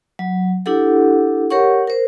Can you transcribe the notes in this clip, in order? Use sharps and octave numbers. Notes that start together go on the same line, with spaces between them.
F#3
D4 E4 G4 A4 F#5
G4 A#4 C#5 F#5 C#6
A#4 C5